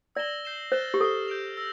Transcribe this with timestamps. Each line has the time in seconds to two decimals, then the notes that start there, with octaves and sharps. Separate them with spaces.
0.15 D5 E6 A#6 E7 G7
0.44 G6 C7 E7 G7
0.72 C5 F6 A6 E7 G7
0.94 G4
1.01 A4 A6 C7 G7
1.28 G6 D7 F7
1.57 E6 A#6